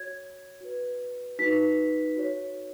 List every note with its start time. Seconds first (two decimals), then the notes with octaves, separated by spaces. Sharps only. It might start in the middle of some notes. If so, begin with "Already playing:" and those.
Already playing: F#4 C#5 G#6
0.61 F#4 B4
1.39 D#4 F#4 B4 B6
2.16 F#4 C#5